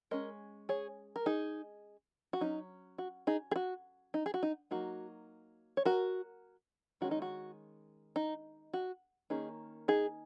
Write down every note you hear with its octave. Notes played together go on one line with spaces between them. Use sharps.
G#3 C#4 A#4 D#5
G#4 C#5
A#4
D#4 G#4
F#4
F#3 C#4 D#4
F#4
D#4 G#4
G#4
F#4
D#4
G#4
F#4
D#4
F#3 A#3 D#4 F#4
C#5
F#4 A#4
D#3 G#3 C#4 F#4
D#4
F#4
D#4
F#4
D#3 A#3 C#4 D#4 G#4
D#4 G#4